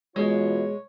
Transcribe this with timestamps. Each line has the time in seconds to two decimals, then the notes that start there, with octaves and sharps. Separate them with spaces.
0.16 B2 E3 G#3 F4 C#5